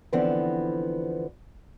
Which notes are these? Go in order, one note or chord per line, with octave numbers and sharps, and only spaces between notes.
D3 E3 F3 B3 C4